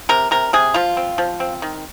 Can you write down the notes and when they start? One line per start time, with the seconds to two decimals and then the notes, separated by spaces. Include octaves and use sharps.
0.09 C3 A#4
0.31 C3 A#4
0.53 C3 G#4
0.74 F3 F4
0.97 C4
1.18 F3
1.40 C4
1.62 D#3